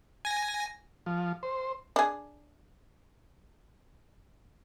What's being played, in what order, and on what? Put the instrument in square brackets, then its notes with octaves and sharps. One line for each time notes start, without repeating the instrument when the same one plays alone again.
[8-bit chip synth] G#5 A#6
[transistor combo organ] F3
C5
[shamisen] D4 G#4